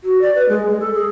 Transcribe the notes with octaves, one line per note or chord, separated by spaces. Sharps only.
F#4
D5
B4
G#3
G#3
A4
G#4